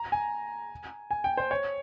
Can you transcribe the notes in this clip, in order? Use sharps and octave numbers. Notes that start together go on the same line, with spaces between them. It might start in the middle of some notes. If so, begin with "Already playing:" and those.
Already playing: A#5
G#5
G#5
G5
C5
C#5